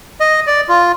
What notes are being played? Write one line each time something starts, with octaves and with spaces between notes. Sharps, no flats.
D#5
D5
F4